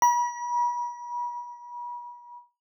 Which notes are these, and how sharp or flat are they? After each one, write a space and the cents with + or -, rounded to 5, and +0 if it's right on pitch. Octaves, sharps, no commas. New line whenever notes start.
B5 -40